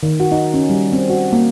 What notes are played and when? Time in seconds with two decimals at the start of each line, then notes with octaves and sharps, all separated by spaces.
0.03 D#3
0.20 F#4
0.32 D#4
0.54 C#4
0.70 G3
0.92 C4
1.10 F#4
1.33 A#3